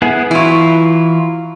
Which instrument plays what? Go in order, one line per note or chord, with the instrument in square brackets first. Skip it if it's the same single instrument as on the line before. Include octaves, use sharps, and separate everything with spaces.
[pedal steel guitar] B3 E4 G#4
[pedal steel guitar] E3 F4 [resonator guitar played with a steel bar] F#3 E4